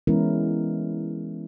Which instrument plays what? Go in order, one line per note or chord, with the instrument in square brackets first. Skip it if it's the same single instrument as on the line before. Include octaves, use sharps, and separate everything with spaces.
[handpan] E3 G#3 B3 C#4 E4 A#4